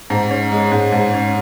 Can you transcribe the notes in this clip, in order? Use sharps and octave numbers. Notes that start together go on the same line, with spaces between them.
G#2
C#4
G#3
G#2
G#2
C#4